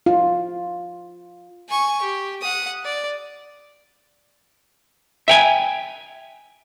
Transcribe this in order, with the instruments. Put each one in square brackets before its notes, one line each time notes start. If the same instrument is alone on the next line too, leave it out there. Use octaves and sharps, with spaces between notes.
[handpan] F4
[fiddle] G#5 C#6
G4
F#5 D#6
D5
[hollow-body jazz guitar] E5 G5 G#5